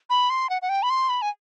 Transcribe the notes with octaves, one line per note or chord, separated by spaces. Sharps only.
B5
C6
F#5
F#5
G5
B5
C6
B5
G#5